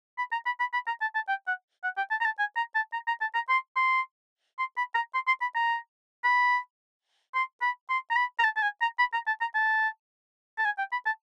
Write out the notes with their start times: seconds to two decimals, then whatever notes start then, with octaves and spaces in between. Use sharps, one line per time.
0.18 B5
0.32 A#5
0.46 B5
0.60 B5
0.73 B5
0.87 A#5
1.01 A5
1.15 A5
1.28 G5
1.47 F#5
1.84 F#5
1.97 G5
2.11 A5
2.21 A#5
2.25 A5
2.39 G#5
2.56 A#5
2.75 A5
2.93 A#5
3.07 A#5
3.21 A5
3.35 A#5
3.49 C6
3.76 C6
4.59 C6
4.77 B5
4.95 A#5
5.14 C6
5.27 C6
5.41 B5
5.55 A#5
6.24 B5
7.35 C6
7.62 B5
7.89 C6
8.11 A#5
8.16 B5
8.39 A#5
8.44 A5
8.56 A5
8.62 G#5
8.81 A#5
8.99 B5
9.14 A#5
9.27 A5
9.41 A#5
9.55 A5
10.58 A5
10.65 G#5
10.78 G5
10.92 B5
11.06 A5